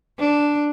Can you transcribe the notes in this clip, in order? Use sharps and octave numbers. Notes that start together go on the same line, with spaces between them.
D4